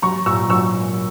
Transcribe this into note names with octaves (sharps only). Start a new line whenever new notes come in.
F#3 A#5 C#6
A#2 C#6 E6
F#3 C#6 E6